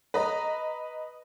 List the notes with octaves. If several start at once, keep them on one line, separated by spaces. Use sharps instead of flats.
B4 D#5 A#5